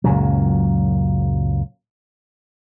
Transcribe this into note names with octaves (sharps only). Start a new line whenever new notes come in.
C#2 F#2 A#2 F#3